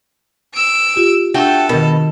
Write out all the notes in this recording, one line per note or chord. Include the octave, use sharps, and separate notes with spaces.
E6 D7
F4 G4
A3 D4 F#4 A4 G5
B2 D#3 A#4